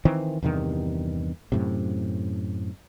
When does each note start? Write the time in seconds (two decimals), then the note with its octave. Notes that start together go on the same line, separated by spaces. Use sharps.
0.05 D#3 E3 C4
0.43 E2 G2 C3 D#3
1.52 F#2 A2 C3